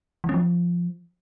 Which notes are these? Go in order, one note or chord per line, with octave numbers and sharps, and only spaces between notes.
E3
C#4
F3